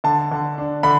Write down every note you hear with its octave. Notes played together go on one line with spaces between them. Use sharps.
D3 A5
D3
D4
D3 B5